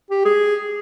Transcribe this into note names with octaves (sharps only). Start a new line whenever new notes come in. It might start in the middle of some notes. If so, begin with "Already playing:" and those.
G4
G#4